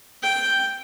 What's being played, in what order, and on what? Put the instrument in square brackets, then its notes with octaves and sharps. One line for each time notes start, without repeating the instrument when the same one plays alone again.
[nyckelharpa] G5